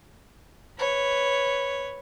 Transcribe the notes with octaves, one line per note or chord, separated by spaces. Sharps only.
B4 C#5